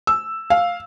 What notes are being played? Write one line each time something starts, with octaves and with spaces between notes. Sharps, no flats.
E6
F5